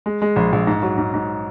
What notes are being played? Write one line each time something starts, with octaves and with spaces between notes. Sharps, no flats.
G#3
G#3
A#1
A#1
G#2
F#3
G#2
G#2